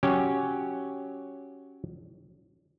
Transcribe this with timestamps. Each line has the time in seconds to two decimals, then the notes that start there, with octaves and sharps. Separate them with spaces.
0.03 F#3 C#4 G4